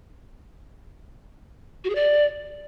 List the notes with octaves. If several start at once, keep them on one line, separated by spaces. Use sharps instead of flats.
F#4
G#4
D5